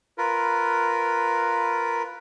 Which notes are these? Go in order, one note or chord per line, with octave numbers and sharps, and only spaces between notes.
F4 A#4 B4